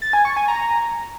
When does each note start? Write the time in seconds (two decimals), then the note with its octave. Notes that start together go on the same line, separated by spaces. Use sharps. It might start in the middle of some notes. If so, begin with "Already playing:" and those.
0.02 A6
0.13 G#5
0.25 C#6
0.37 G#5
0.48 A#5